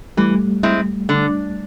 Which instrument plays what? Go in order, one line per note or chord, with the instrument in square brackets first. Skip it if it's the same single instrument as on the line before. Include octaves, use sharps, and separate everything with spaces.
[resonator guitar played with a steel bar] E3 [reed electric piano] G3 A3
[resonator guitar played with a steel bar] G#3 C4 E4
D3